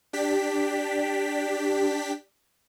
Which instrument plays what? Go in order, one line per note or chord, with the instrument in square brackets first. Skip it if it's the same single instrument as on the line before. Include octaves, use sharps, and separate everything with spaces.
[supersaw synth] D4 G4 B6